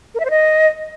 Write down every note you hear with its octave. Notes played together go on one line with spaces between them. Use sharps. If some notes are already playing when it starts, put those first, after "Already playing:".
A#4
E5
C5
D#5